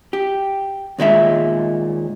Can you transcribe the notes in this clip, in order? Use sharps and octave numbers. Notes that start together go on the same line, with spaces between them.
G4
D#2 A#2 G#3 E5